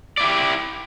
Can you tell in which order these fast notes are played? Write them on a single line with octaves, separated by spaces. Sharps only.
D5 E4 G4